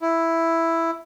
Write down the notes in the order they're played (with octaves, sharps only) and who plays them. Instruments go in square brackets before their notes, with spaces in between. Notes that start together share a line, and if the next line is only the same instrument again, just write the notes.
[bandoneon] E4